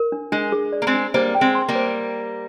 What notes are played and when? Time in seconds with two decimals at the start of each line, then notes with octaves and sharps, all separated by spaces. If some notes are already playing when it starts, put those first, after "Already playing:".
Already playing: A#4
0.12 D4
0.32 G#3 D4
0.52 G#4
0.73 D5
0.82 A#3
0.87 G#3 C4
0.94 D4
1.14 G3 A#3 C5
1.35 G5
1.41 G#3 C4
1.55 C6
1.68 G3 A#3
1.75 C5